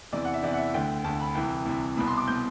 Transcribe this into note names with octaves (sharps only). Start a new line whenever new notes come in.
E2 C3 E3 D5
F#5
E5
E2 C3 E3 D5
F#5
E5
D2 D3 G5
D2 D3 A5
B5
C2 C3 E3 G5
C2 C3 E3
C2 B2 B5
C6
D6
B2 G6